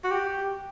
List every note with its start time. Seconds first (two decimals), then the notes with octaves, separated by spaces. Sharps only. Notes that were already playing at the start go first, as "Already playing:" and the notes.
0.04 F#4
0.11 G4